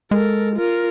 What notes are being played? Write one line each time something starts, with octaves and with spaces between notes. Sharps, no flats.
G#3 A4 A#4
F4 A#4